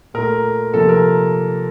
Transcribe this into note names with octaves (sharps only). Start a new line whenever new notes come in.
A#2 A3 A#4
C3 F3 A#3 A4
A#4